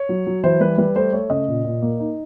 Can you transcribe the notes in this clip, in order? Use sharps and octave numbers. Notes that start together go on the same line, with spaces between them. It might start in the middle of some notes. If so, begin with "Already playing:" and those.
Already playing: C#5
F#3
F#3
E3 C5
G3 B4
G3 B4
A3 C5
A3 C#5
C#3 D#5
A#2
A#2
A#3
D#4